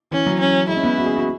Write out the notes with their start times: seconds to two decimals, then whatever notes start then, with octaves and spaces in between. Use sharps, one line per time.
0.11 E3 C#4
0.26 F#3
0.40 C#4
0.68 G#3 E4
0.76 C#4
0.83 B3
0.98 F#4
1.06 G#4
1.16 F#4